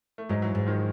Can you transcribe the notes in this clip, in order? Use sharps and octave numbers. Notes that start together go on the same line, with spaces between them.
A3
G#2 F#3 G#3
E3 F#3
G#2
D#3 F3